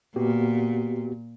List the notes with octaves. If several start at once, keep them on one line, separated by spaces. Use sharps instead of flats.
A#2 B3 F#4 G4